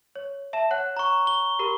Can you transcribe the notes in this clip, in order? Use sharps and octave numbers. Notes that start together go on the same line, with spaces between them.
C#5
E5 A5 E7
C#5 F#5 F#6
A#5 C#6
G7
G4 A#4 B5